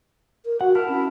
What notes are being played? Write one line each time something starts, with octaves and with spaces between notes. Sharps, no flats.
A#4
F#4 F#5
E4 A#4 A5 F6
C#4